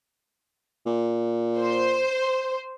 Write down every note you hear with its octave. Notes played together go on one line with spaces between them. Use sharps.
A#2
C5